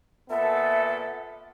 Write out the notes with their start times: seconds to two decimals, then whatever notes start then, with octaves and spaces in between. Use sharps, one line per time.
0.30 A#2 B3 A4 E5